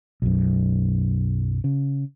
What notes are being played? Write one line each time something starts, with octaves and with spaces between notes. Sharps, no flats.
B1 F#2
C#3